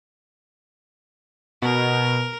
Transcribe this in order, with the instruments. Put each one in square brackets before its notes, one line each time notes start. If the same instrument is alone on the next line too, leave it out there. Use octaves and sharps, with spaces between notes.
[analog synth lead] B2 [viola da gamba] A#4